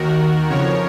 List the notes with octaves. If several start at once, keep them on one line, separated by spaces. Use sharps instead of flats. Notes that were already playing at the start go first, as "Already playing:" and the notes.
Already playing: D#2 D#3 F#4 A#4
F2 C#3 F3 A#4 C#5